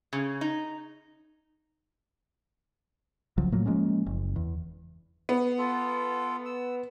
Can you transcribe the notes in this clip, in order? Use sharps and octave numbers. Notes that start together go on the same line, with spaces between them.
C#3
D#4
C2 C#3 F3 F#3
A2 F3 F#3 A#3
F3 G#3 A#3 C#4
F#1
E2
B3
F4 A4
E6